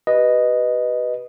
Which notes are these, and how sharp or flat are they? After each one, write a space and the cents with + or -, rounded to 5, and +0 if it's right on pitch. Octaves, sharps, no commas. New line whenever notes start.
G4 -25 B4 -5 D#5 -5